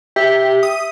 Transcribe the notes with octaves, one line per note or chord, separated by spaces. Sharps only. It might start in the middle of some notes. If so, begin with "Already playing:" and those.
G4 E5
D#6